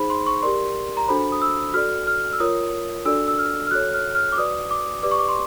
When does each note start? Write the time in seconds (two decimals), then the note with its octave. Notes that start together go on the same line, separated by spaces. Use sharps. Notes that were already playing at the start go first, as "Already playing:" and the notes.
Already playing: D#4 G#4 C5 B5
0.10 C6
0.26 C#6
0.42 G4 A#4 D5 C6
0.97 A#5
1.08 D4 F#4 A4 C5 B5
1.32 D#6
1.42 E6
1.74 F#4 A4 D5 F6
2.07 F6
2.33 E6
2.40 F4 A#4 C#5 D#6
3.05 D4 F#4 A4 D5 E6
3.28 E6
3.39 F6
3.67 F6
3.71 F#4 A4 C#5 F#6
3.94 F6
4.15 F6
4.32 D6
4.37 F#4 B4 D5 D#6
4.71 D6
5.03 G4 B4 D5 D6
5.11 C#6
5.19 D6
5.29 C6